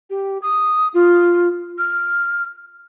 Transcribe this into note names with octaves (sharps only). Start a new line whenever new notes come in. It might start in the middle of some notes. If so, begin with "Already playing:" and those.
G4
D#6
F4
F6